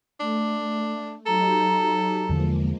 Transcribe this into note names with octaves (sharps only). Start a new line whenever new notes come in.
A3 D4
F#3 D#4 G4 A4 A#5
E2 D3 F3 G#3 A#3